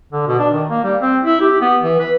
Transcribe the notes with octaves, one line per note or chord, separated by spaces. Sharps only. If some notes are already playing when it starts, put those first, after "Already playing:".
D3
B2
D4
D#3
A#3
G3
C4
E4
G4
B3
E3
B4